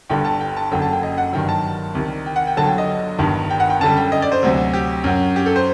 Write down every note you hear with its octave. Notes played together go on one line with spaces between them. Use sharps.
G1 G2 D3 G3 G5
A5
G5
A5
F#1 F#2 D3 F#3 G5
A5
G5
D#5
F#5
G1 G2 D#3 F#3 G5
A5
C2 C3 D#3
G5
F#5
G5
G1 G2 D3 F#3 A5
G5
D#5
G1 G2 D#3
G5
F#5
G5
F#2 D3 G3 A5
G5
D#5
D5
C5
D2 C3 F#3
G4
F#2 F#3
G4
A4
C5